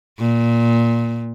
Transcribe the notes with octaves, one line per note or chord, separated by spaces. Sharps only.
A#2